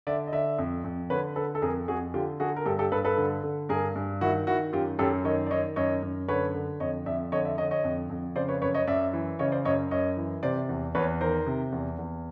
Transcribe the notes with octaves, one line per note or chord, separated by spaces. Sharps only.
D3 D5 E5
D#5
D3 D5 E5
F2
F2
D3 B4 C#5
D3 A4 B4
A4
F2 G#4 A#4
F2 F#4 G#4
D3 F4 G4
D3 F#4 G#4
A#4
G2 G4 A4
G4 A4
G2 A4 B4
A4 B4
D3
D3
G2 G#4 A#4
G2
D#3 E4 F#4
D#3 E4 F#4
F#2 F4 G4
F#2 G4 A4
D#3 C#5 D#5
D5
D#3 C#5 D#5
F#2 C#5 D#5
F#2
D3 B4 C#5
D3
F2 C#5 D#5
F2 D5 E5
D3 C#5 D#5
D5 E5
D3 C#5 D#5
C#5 D#5
F2
F2
C#3 C5 D5
B4 C#5
F#2 B4 C#5
C#5 D#5
F#2 D5 E5
E3
C#3 C#5 D#5
C5 D5
F#2 C#5 D#5
F#2 C#5 D#5
E3
C3 C5 D5
E2
E2 B4 C#5
D#3 A#4 C5
C3
E2
E2